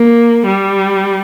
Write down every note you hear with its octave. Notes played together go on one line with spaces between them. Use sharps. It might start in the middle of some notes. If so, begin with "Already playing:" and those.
Already playing: A#3
G3